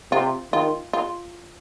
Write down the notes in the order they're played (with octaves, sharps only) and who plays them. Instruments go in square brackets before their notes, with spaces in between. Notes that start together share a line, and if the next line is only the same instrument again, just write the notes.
[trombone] C3 [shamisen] F4
[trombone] D#3 [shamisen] F4
[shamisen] F4